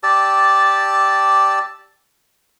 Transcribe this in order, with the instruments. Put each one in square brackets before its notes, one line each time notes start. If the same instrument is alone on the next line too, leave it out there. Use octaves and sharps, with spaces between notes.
[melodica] G4 D5 A5 E6